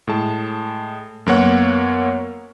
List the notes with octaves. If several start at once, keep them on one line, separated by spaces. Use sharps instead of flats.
A2 G#3 A5
F#2 F#3 A#3 B3 C#5 F#5